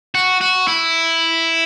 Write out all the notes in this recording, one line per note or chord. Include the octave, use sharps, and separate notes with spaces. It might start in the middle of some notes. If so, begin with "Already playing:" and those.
F#4
F#4
E4